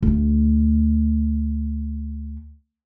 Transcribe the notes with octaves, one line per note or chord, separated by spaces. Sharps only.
D2 A3